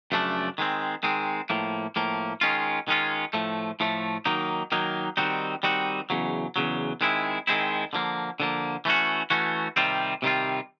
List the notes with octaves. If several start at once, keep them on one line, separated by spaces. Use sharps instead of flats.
F#2 C#3 F3 A3 D4
D#3 G#3 C4
D#3 G#3 C4
A2 F3 A#3
A2 F3 A#3
D#3 G#3 C#4 F4
D#3 G#3 C#4 F4
A2 F3 A3
A2 F3 A3
D#3 F#3 A#3 D#4
D#3 F#3 A#3 D#4
D#3 G3 C4 D#4 F#4
D#3 G3 C4 D#4 F#4
E2 C#3 F#3
E2 C#3 F#3
D#3 G#3 C4 E4
D#3 G#3 C4 E4
D3 F3 A#3
D3 F3 A#3
E3 A3 C#4 F#4
E3 A3 C#4 F#4
C3 D#3 G3 C4 F4
C3 D#3 G3 C4 F4